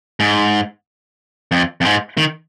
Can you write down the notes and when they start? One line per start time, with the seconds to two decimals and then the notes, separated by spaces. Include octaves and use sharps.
0.20 G#2
1.52 F2
1.81 F2
1.85 G#2
2.17 D#3